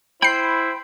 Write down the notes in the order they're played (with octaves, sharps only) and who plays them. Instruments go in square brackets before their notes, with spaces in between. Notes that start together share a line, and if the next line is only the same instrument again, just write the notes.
[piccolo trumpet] E4 [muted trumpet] C5 [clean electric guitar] G5 B5 [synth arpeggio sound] G6 C7